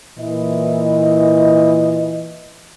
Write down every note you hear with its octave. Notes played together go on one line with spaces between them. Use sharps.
A#2 E3 D#5